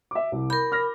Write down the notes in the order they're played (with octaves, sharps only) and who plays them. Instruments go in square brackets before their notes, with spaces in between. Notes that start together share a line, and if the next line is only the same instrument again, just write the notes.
[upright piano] E5 D6
C2
[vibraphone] A#4 B5 [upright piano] G6
[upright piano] F6 A#6